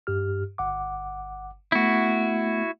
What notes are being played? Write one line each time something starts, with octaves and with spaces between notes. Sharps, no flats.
G2 G4 F6
G1 F#5 D6
A3 B3 E4 F#4